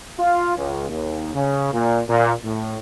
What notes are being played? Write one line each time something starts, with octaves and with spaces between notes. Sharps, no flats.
F4
C#2
D#2
C#3
A#2
A#2
A2